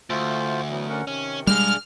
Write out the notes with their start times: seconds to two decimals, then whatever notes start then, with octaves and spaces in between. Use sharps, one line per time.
0.10 D2 A3 F4 C5
0.70 E3 F#3 B3
0.89 C#4 A#4 F#5
1.08 C3 D#3 C#4
1.47 G3 G#3 D4 G#4 F6